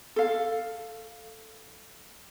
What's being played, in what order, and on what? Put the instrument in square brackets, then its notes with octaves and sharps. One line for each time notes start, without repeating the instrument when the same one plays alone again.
[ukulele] A4 F5